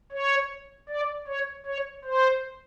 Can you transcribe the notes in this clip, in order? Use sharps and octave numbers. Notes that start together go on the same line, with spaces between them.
C#5
D5
C#5
C#5
C5